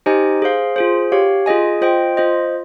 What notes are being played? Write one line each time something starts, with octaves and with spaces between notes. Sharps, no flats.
D#4 G4 C5 D#5 G#5
G#4 C5 F5
F4 G#4 C5
G4 C#5 F5
F4 G#4 D#5 G#5
F4 C5 D#5 G5
F4 C5 D#5